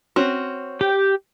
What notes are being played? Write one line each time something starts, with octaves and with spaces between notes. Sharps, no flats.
C4 C#4 F#4
G4 G5